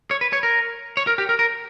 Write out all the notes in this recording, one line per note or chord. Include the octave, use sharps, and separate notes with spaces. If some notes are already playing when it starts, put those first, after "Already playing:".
C#5
B4
C#5
A#4
C#5
A#4
G4
A#4
A#4